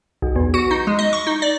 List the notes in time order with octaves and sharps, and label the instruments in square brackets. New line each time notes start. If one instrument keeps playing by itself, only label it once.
[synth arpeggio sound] B1
E2
F#4
D#4
G#3
D#5
C#6
D#4
D5